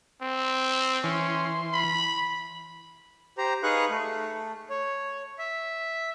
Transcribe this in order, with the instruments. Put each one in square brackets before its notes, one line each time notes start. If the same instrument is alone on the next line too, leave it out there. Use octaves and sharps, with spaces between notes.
[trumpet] C4
[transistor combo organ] E3 C6 [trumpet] C#4
[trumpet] B5
[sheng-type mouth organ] G4 C5 A#5
D#4 G#4 B4 F5 C#6 F#6
A3
C#5
E5